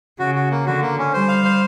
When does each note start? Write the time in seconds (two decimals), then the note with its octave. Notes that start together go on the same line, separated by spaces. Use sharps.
0.19 C#3 F#4
0.35 F#4
0.51 A#3
0.66 D3 F#4
0.82 A#3
0.98 C#4
1.13 G3 C5
1.28 F5
1.45 C5